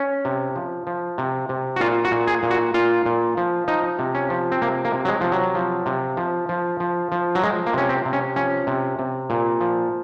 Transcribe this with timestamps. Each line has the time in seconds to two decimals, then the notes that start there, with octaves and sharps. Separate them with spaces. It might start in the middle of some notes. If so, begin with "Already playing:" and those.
Already playing: C#4
0.25 C3
0.56 F3
0.87 F3
1.18 C3
1.49 C3
1.76 F#4
1.80 A#2 F4
2.05 F#4
2.11 A#2
2.27 G#4
2.43 A#2
2.51 F#4
2.74 A#2 F4
3.06 A#2
3.37 F3
3.68 F3 D#4
3.99 C3
4.15 C#4
4.30 F3
4.52 C4
4.62 C3 A#3
4.85 A#3
4.93 C3
5.05 F#3
5.08 G#3
5.21 C3 F3
5.32 F#3
5.55 F3
5.86 C3
6.17 F3
6.49 F3
6.80 F3
7.12 F3
7.35 F#3
7.43 F3 G#3
7.66 A#3
7.73 C3 C#4
7.89 C4
8.05 C3
8.13 C#4
8.36 F3 C#4
8.67 C3
8.99 C3
9.30 A#2
9.61 F3